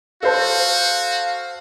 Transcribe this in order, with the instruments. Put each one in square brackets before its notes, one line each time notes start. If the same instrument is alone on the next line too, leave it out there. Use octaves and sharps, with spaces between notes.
[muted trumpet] F#4 [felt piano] A4 C5 A5 [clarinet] F5